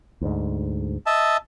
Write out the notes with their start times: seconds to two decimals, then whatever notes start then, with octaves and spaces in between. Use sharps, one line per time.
0.21 D2 G#2
1.06 D#5 E5 A5